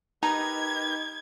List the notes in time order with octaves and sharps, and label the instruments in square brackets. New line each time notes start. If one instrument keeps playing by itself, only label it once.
[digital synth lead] D#4 [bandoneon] G4 A#4 B4 [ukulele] A#5 [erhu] G#6